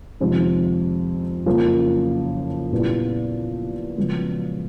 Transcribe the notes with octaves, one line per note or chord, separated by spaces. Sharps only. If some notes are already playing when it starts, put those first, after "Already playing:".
F2 C3 D#3 G#3 C4
F#1 F2 C#3 F3 A#3
A#2 G3 B3 E4
F#2 C#3 F3 G#3 B3